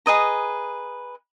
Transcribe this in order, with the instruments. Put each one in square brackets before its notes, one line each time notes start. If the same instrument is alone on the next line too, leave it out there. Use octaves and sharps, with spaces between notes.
[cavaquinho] G#4 B4 D#5 A#5